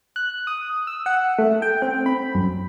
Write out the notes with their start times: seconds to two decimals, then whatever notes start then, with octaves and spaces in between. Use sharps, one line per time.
0.16 F#6
0.47 D#6
0.87 E6
1.06 F#5
1.38 A3
1.62 G5
1.82 C4
2.06 B5
2.35 F#2